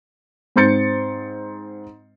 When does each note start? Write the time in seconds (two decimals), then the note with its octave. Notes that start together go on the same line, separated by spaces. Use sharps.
0.56 G#2 C4 C6 G6 A6 C#7